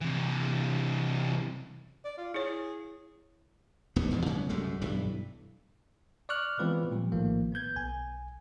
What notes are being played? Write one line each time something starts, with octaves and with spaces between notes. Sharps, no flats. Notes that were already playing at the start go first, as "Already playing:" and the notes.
C3 E3
D5
F4
E4 G#4 C#5
D#1 A#1 D#2 B3
E2 G#2 B2 G#3
C#3 F#3 G#3 B3
C2 F#2 G#3 A3
B1 G2 E3
D5 C#6 D6 F6 F#6
E3 G#3 B3 C4 F4 B4
A#2 F3 G3
A#1 A2 D#3 F3 A3 A#3
B3 B4 G6 G#6
B1 G#5